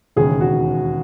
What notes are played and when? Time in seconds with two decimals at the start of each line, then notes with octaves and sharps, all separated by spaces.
0.16 E1 D#2 C#3 G#4
0.41 F#4